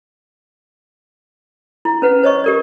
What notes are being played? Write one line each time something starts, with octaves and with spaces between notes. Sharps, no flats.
E4
C#4 B4 F#5
C5 C#5 D#5 C#6
G4 A#4 D5